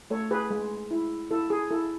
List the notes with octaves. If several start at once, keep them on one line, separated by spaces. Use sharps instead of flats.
A3 A4 C#5
G#4 B4
G#3
E4
E4 A4
G#4
E4 A4